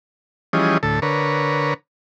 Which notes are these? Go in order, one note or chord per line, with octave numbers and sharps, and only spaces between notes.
E3 F3 G3 C#4 G#4 D#5
D2 A2 A4
D3 A#4 B4 C#5